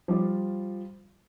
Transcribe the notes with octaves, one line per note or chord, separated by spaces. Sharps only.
F3 G3 F4 D6